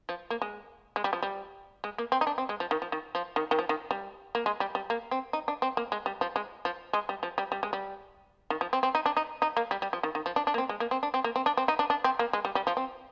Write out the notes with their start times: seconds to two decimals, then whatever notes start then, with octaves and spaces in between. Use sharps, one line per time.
0.09 F3
0.30 A#3
0.42 G#3
0.96 G#3
1.04 G3
1.13 F3
1.22 G3
1.84 G#3
1.98 A#3
2.12 C4
2.21 D#4
2.27 D4
2.38 C4
2.49 G#3
2.60 F3
2.71 D#3
2.82 F3
2.92 D#3
3.15 F3
3.36 D#3
3.51 D#3
3.59 F3
3.69 D#3
3.91 G3
4.35 A#3
4.46 G#3
4.60 G3
4.75 G3
4.90 A#3
5.11 C4
5.33 D#4
5.48 D4
5.62 C4
5.77 A#3
5.92 G#3
6.06 G3
6.21 F3
6.36 G#3
6.65 F3
6.93 G#3
7.09 G3
7.23 F3
7.38 G3
7.52 G3
7.63 G#3
7.73 G3
8.50 D#3
8.61 F3
8.73 C4
8.83 C4
8.95 D#4
9.06 D4
9.17 D#4
9.42 D#4
9.57 A#3
9.71 G3
9.82 G3
9.93 F3
10.03 D#3
10.15 D#3
10.26 F3
10.36 D4
10.47 D4
10.54 A#3
10.58 C4
10.69 G#3
10.80 A#3
10.91 C4
11.03 D4
11.14 C4
11.24 A#3
11.36 C4
11.46 D4
11.57 C4
11.68 D#4
11.79 D4
11.90 D4
12.04 C4
12.19 A#3
12.33 G#3
12.45 G3
12.55 G3
12.67 F3
12.77 C4